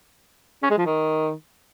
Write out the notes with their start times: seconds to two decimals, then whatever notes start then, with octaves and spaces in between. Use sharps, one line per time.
0.63 C#4
0.70 G#3
0.78 F3
0.86 D#3